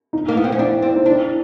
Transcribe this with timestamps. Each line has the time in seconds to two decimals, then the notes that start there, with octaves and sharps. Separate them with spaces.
0.13 D#4
0.28 A#3
0.36 B3 E4
0.44 C4
0.52 C#4
0.59 D4 E4
0.82 C4
0.95 D#4
1.06 D4 E4